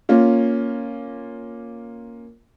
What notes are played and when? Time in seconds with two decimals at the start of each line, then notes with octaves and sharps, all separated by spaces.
0.09 A#3 C#4 F4